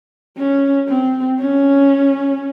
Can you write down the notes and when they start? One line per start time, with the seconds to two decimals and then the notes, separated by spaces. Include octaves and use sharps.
0.37 C#4
0.88 C4
1.40 C#4